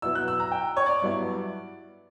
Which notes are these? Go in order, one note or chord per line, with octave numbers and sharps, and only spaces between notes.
B2 F#3 B3 E4 E6
F#6
E6
A#5
G5
C#5
D5
G2 F#3 B3 E4